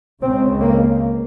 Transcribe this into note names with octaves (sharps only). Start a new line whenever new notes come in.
C#2 C#3 C4
A#3